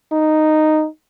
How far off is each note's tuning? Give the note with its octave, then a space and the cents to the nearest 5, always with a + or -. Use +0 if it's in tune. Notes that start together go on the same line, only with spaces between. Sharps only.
D#4 -5